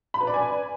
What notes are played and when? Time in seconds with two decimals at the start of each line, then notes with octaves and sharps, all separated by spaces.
0.14 B5
0.21 B4
0.27 D5
0.34 G#5